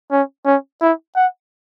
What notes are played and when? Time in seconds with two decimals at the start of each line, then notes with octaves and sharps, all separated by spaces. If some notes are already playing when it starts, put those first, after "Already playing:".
0.12 C#4
0.46 C#4
0.81 E4
1.16 F#5